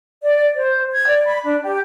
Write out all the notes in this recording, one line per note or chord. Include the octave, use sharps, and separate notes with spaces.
D5
C5
G#6
D5
B5
D4
G4